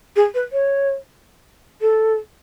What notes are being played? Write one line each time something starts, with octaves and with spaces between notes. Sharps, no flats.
G#4
B4
C#5
A4